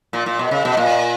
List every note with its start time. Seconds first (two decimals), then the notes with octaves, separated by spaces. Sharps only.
0.13 A#2
0.26 A#2
0.39 B2
0.51 C#3
0.65 B2
0.77 A#2